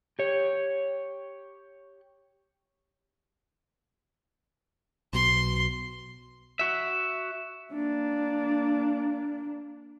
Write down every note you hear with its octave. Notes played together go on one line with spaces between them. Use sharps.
G4 C#5
B1 B2 C6
F#4 E5
A#3 D4